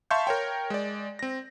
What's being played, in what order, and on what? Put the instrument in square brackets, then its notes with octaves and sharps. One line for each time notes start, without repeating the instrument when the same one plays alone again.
[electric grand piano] E5 F5 A5 C6 C#6 G6
A#4 C#5 G5
G#3 D5
C4 A#6